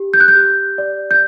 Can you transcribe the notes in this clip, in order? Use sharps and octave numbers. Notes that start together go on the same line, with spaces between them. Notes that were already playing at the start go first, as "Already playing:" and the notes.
Already playing: G4
G6
F#6
G6
G4
D5
G6